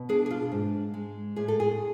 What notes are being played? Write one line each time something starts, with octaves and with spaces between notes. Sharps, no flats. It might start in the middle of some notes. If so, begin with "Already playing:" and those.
Already playing: B2
D4 G#4
G#4
F4
G#2
G#3
A2 G#4
A4
G#4